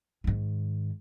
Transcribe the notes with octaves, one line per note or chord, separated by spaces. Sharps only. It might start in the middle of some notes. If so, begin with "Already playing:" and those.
G#2 D#3